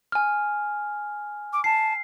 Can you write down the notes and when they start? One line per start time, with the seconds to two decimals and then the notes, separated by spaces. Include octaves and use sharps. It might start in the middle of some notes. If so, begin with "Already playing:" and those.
0.12 G#5 F6
1.52 D6
1.64 A5 C7